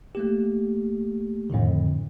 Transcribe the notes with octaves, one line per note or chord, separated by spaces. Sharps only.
A3 A#3 G4
F2 A2 D3 D#3